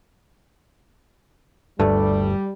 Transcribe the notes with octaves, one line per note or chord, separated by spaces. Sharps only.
G1 D2 G2 G3 A3